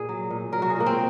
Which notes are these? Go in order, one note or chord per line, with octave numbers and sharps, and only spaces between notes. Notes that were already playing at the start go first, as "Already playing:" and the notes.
Already playing: A#2 G#4
F#3
A#2
F#3 A#4
F#4
G#4
A#2 A#3
C4